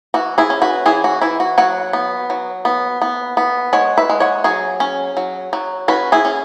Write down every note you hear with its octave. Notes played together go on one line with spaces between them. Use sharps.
E3 F#4
E4 G#4
C#4
F#4 B4
E3 E4 G#4
F#4
E3 E4
F#4
F#3 C#5 F#5
B3
F#3
B3
B3
B3
G#3 C#5 F#5
B4 E5
G#3
C#5 F#5
F#3 G#4 C#5
C#4
F#3
F#3
C#4 F#4 B4
E4 G#4
C#4